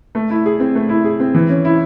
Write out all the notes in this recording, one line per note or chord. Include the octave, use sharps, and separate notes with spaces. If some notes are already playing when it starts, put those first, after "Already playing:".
A3
E4
G#4
C4
A3
E4
G#4
C4
E3
C#4
E4